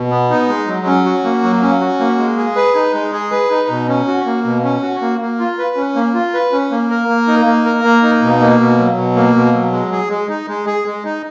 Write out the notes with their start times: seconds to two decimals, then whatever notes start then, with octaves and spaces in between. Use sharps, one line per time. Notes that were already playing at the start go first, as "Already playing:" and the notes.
Already playing: B2
0.11 B3
0.30 D#4
0.49 G#3
0.68 F#3
0.87 C#4
1.05 F#4
1.24 A#3
1.43 F#3
1.62 C#4
1.81 F#4
2.00 A#3
2.18 G#3
2.37 G#4
2.56 B4
2.75 D#4
2.94 G#3
3.13 G#4
3.31 B4
3.51 D#4
3.69 B2
3.88 C#4
4.08 F#4
4.26 A#3
4.45 B2
4.63 C#4
4.82 F#4
5.01 A#3
5.21 A#3
5.39 F4
5.58 B4
5.76 C#4
5.95 A#3
6.14 F4
6.34 B4
6.52 C#4
6.71 A#3
6.90 A#4
7.08 A#3
7.28 D#4
7.46 A#3
7.65 A#4
7.84 A#3
8.03 D#4
8.22 B2
8.41 A#3
8.60 B2
8.79 F#3
8.97 B2
9.16 A#3
9.35 B2
9.54 F#3
9.72 G#3
9.92 G#4
10.10 G#3
10.29 D#4
10.48 G#3
10.67 G#4
10.86 G#3
11.05 D#4